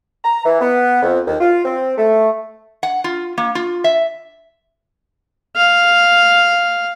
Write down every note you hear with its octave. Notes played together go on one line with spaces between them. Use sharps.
A#5
E3
B3
F2
D#2
F4
C4
A3
F#5
F4
A#3
F4
E5
F5